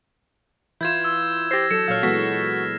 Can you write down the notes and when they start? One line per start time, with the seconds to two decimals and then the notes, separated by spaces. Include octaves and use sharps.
0.81 E3 E4 F4 G6 G#6 E7
1.04 E6
1.51 G4 C5 A6 A#6 C7
1.71 F#3 A4 C#7 E7
1.88 A#2 F#3 C#5 F5 E6 F6
2.03 E3 G#3 B3 F#4 A4 B6